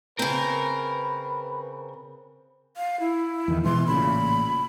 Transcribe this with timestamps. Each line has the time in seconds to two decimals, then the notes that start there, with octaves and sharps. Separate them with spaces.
0.19 C#3 C4 A#4 B4
2.77 F5
3.00 E4
3.48 E2 D#3
3.65 B2 E3 G#3 C6
3.87 A1 A#2 C#3 B5